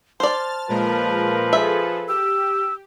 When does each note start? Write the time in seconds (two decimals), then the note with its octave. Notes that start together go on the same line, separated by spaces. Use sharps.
0.20 C5 D5 A5 F6 A6
0.69 A#2 F3 G#3 F4 A#4 B4
1.53 G#4 A4 E5
2.08 G4 E6